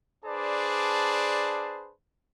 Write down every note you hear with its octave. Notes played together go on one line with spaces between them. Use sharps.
D4 G#4 B4 C5 D5 A5